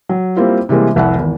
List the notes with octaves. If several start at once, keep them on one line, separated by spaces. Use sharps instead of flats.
F#3
G3 A#3 C4 E4 F4
C3 E3 G3 G#3 A#3
F1 C2 E5 F#5
G#1 E2